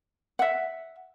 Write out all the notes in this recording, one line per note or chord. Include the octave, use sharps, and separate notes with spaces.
E5 F#5